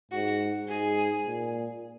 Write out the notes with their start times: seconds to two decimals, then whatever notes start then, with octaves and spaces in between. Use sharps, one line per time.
0.11 G#2 F#4
0.69 G#2 G#4
1.27 A#2